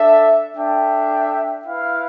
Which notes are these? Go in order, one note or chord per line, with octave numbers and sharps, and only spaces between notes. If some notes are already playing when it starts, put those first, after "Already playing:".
Already playing: D4 A4 E5
D4 A4 E5 G5
E4 B4 F5